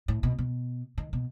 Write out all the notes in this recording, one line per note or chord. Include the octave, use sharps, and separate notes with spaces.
A2
B2
B2
D#3
B2